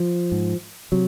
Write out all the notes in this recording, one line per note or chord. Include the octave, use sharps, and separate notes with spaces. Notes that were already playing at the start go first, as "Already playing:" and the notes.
Already playing: F3
G#2
C3 F#3